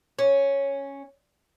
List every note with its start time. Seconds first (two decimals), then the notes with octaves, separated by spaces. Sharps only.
0.19 C#4